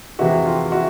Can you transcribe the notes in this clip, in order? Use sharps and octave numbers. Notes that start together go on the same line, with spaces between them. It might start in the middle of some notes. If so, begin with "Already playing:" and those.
F2 C3 E3 G#3 E4 F#4
F4 G4
E4 F#4